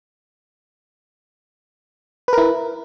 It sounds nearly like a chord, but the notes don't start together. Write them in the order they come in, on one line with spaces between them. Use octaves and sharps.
B4 A#4 E4